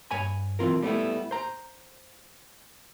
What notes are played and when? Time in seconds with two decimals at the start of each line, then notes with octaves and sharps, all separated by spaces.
0.11 G2 C#5 G#5 B5
0.59 B1 E3 C4 F4 A#4
0.82 G3 A3 B3 E4
1.31 C5 A#5